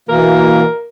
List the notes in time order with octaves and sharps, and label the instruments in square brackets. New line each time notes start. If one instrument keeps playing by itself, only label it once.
[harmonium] B2 E3 A#3 [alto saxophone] A#4